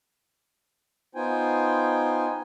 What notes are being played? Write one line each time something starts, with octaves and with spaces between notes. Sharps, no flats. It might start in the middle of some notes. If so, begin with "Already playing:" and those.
B3 D#4 F4 C5 G5 G#5